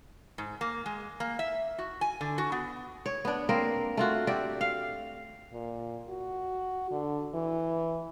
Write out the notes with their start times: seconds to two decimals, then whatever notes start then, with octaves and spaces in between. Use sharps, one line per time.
0.38 G#2
0.61 A#3
0.86 G#3
1.20 A#3
1.39 E5
1.78 F#4
2.01 G#5
2.21 D3
2.38 F#4
2.52 B3
3.06 C#5
3.25 B3 D4
3.49 A#3 C4 A#4
3.97 A3 F4 F#4
4.27 F#4 G4 D5 E5
4.61 F5
5.53 A#2
6.09 F#4
6.91 D3
7.34 E3